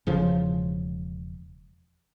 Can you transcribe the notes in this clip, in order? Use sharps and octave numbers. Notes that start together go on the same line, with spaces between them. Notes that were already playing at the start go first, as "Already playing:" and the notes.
E1 C#3 F3